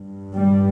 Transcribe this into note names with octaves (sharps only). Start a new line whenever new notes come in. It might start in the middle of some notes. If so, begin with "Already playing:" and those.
Already playing: G2
G3